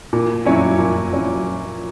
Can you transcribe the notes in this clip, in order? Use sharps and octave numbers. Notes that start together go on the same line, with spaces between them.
A#2
F#3 C#4 E4
A#2
F#3 C#4 E4